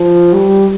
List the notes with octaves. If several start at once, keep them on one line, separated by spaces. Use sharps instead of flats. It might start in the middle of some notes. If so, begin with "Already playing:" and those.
Already playing: F3
G3